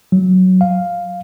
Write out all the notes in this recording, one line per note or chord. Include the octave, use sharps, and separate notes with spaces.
F#3
F5